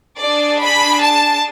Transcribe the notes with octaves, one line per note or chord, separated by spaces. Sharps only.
D4 G#4 D5
B5
A5